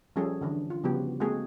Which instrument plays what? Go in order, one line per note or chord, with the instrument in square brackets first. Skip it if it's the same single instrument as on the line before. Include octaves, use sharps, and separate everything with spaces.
[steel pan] F3 G3 C#4 G#4 A4
D3 E3 D4
F4
C#3 F3 G3 B3 F#4 G4
G#3 A#3 C4 F#4 G#4 A4